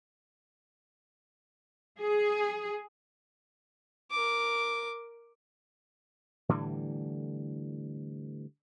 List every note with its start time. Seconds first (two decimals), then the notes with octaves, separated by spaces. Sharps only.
1.99 G#4
4.11 A#4 D6
6.49 A2 D3 E3 G3